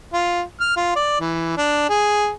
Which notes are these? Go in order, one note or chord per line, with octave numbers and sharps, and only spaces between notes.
F4
F6
F4
D5
E3
D4
G#4